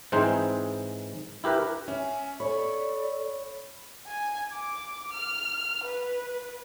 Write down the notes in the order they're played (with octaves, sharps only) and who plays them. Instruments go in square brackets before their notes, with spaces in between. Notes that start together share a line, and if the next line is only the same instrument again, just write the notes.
[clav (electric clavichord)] G#2 E3 C4 D#4 G#4 C5
E4 G4 A#4 B4
[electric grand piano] C#4 [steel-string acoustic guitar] E5 [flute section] G#5
[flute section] A4 D5 [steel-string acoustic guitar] C#5 [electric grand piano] B5
[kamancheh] G#5
D6
F6
B4